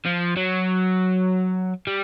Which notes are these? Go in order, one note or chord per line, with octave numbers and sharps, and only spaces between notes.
F3
F#3
G3